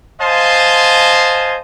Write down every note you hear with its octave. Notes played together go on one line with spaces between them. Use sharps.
C5 D#5 F5 G#5 A5 C6